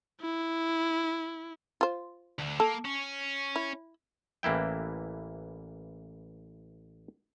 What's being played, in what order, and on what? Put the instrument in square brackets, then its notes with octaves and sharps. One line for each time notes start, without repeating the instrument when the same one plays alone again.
[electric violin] E4
[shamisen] F4 C5
[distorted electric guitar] D2 D3
[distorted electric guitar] A#3 [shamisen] A4
[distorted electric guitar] C#4
[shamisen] E4
[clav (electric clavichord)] A1 E3 A#3 E4 G5